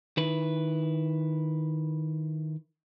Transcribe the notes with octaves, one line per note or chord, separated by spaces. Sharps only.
D#3 E4 B4